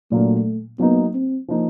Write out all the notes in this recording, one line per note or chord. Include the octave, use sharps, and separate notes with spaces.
A#2 F#3 A3 A#3 D4
F#3 A#3 B3 D#4
C4
F3 A#3 D#4